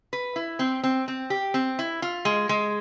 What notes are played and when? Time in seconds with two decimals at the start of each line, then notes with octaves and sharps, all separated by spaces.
0.13 B4
0.36 E4
0.59 C4
0.83 C4
1.08 C4
1.30 G4
1.54 C4
1.79 E4
2.02 F4
2.25 G#3
2.49 G#3